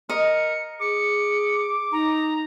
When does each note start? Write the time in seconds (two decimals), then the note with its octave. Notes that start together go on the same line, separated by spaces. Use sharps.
0.10 A#4 D#5 C#7
0.80 G#4 D6 C#7
1.92 D#4 A#5